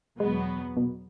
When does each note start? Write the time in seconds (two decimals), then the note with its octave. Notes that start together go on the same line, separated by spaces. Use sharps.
0.19 E2 B2 F#3 G#3 B3
0.77 B2